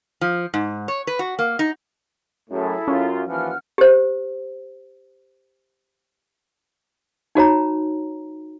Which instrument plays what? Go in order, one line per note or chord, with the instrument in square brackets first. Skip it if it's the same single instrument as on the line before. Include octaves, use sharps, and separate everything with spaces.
[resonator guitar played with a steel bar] F3
G#2
C#5
B4
F#4
A#3
D#4
[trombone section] F#2 A2 [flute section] E4 G#4 A4
[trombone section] F#2 F4 [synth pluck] C#4
[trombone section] D#2 E3 F3 [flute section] F#5 F6
[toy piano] G4 C5
D#4 F#4 C#5 A#5